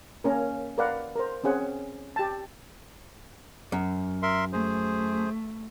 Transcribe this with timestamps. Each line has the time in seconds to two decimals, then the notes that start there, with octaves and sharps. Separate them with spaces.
0.24 A#3 C#4 A#4
0.78 A#4 B4 D5 F5 F#5
1.16 A#4 C5
1.44 C4 C#4 G#4 F#5
2.16 G4 A5
3.72 F#2
4.23 A#4 E5 C6
4.53 A3 G#4 C5